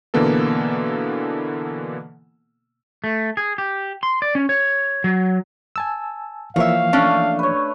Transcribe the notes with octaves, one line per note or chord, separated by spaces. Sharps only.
B2 D3 E3 A#3 B3 A4
A3
G#4
G4
C6
D5
C#4
C#5
F#3
G#5 A5 E6
E3 F3 A#3 C#5 E5 F5
A3 C#4 D4
B4 C#5